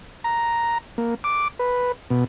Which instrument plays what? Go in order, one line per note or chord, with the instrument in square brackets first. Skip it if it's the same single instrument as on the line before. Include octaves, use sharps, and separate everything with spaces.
[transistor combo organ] A#5
A#3
D6
B4
B2